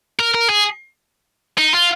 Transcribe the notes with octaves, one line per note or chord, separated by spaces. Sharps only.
A#4
A#4
G#4
D#4
F4